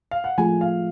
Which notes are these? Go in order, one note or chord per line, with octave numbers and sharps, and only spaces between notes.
F5
F#5
F3 A3 F4 G#4 G#5
F5